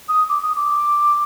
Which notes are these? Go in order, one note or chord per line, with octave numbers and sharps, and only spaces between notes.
D#6
D6
D#6
D6